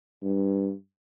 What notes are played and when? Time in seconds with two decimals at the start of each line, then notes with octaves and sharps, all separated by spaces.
0.23 G2